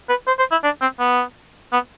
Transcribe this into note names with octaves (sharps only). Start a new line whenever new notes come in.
B4
C5
C5
E4
D4
C4
B3
B3